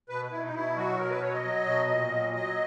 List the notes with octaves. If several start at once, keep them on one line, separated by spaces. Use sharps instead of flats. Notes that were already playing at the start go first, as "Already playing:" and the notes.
B2 B4
B2 E4
D#4
B2 E4
F#3 F#4
B2 A#4
B4
F#3 C#5
D#5
F#3
B2
A#2
F#3
F#3 D#5